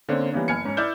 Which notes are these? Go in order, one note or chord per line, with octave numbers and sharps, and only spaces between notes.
D3 A#3 C4 C#4
E3 G3 A#3 B3 C#4
F#1 G#5 F6 G#6 C#7
G#2 C#4
E4 D5 F6 G6 E7